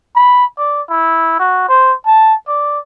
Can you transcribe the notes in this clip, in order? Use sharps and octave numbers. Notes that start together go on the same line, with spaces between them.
B5
D5
E4
F#4
C5
A5
D5